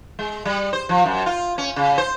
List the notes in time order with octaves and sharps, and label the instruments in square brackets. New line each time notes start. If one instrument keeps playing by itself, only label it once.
[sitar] G#3
G3
C5
F3
F#2
F4
C#4
C#3
C5